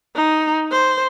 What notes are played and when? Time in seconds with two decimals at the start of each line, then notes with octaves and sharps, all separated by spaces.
0.15 D#4
0.72 C5